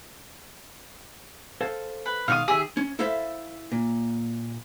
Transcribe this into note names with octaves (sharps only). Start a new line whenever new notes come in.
A4 C5 F5
B4
B2 D#3 G#3 F5 F#5 D#6
D#3 G4 G#4 E5
C#4
E4 A4 C5 E5 F5
A#2